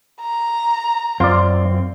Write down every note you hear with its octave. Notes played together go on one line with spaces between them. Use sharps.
A#5
F#2 C4 F4 D5